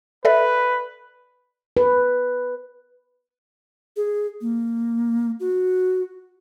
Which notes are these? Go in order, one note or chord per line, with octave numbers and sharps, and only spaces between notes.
A4 B4 D5 E5
B4
G#4
A#3
F#4